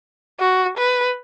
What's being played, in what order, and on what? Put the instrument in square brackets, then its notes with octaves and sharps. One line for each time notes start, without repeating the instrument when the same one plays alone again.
[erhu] F#4
B4